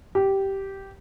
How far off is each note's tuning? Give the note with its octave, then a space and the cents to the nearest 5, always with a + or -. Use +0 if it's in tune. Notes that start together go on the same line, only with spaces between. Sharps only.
G4 -10